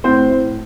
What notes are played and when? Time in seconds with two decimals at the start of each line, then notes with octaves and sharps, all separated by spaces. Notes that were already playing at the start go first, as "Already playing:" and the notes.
0.04 A2 C4 C5
0.30 A2